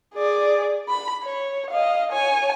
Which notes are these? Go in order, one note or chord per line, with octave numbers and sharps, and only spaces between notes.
G#4 D5
B5
C#5
D#5 F5
C#5 G#5